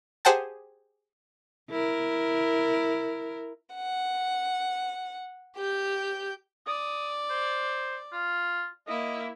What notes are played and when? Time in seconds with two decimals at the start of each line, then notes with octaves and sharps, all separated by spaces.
0.25 G4 G#4 C5 F#5 G5 A5
1.70 E4 A#4
3.76 F#5
5.56 G4 G6
6.67 D5 D#6
7.30 C5
8.13 F4
8.87 A#3 E4 D#5